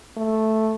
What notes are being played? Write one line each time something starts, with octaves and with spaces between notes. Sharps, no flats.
A3